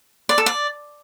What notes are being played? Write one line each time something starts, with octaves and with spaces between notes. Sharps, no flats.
D5
A4
D5